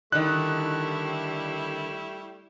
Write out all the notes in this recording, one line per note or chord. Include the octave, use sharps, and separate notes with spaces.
D3 D#3 G3 A3 E4 F#6